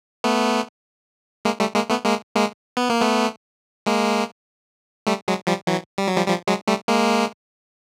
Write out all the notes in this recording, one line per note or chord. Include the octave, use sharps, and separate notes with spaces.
A3 B3
G#3 A#3
G3 A3
G#3 A#3
A3 B3
G#3 A#3
G#3 A#3
B3
A#3
A3 B3
G#3 A#3
G3 A3
F#3 G#3
F3 G3
E3 F#3
G3
F#3
F3 G3
F3 G3
F#3 G#3
G3 A3
G#3 A#3